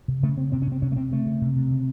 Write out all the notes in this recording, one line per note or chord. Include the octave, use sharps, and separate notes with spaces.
C3
C#3 A3
C#3 C4
C3 C4
C#4
C3 C4
C3 C#4
A3
C3 C4
C#3 A3
C#3
C3
C3
C#3